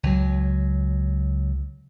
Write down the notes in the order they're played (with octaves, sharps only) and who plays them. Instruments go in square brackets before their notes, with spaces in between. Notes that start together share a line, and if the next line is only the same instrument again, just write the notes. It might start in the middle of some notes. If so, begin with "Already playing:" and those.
[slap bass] C#2 F#3